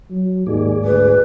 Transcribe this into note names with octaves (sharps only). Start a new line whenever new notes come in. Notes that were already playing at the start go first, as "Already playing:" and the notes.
F#3
D#2 G#2 G#4 D5
D2 B4